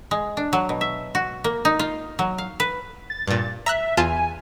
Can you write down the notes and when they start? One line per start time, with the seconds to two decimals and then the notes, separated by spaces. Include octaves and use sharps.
0.11 G#3
0.37 D4
0.53 F#3
0.69 B2
0.81 E5
1.15 F#4
1.44 A#3
1.65 D#4
1.79 F4
2.19 F#3
2.38 F5
2.60 B4
3.10 A6
3.28 G2 A#2
3.66 E5 A#5 E6 F#6
3.97 E2 F4 G#5 A5